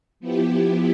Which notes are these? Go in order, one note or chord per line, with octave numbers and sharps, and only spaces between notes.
F3 B3 E4 G4